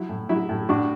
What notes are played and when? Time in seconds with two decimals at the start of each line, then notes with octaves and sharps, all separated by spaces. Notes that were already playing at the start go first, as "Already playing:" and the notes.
Already playing: F#3 E4
0.09 A2
0.29 F#3 E4
0.49 A2
0.69 A2 D4 F#4